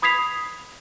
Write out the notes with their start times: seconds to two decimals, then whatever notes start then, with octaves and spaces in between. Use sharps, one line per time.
0.02 B5 D#6 G#6 B6 C7 F7